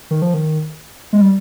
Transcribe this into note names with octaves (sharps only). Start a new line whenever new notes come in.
D#3
F3
D#3
G#3
G3